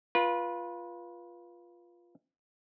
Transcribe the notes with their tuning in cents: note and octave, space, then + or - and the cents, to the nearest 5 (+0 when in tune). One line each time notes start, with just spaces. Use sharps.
F4 +0 B4 -25